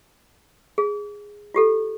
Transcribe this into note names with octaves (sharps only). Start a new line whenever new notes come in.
G#4
F4 G4 A4